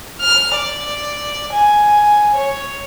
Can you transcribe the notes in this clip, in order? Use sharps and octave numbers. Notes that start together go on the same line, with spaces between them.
F6
D5
G#5
C#5